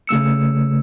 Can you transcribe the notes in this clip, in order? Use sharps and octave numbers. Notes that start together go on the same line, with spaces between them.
C#3 A3 E6 C#7